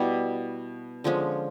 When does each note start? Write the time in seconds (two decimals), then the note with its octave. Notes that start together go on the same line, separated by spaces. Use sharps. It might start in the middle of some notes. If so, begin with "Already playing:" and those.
Already playing: B2 G3 B3 E4
1.04 D3 F3 G#3 C#4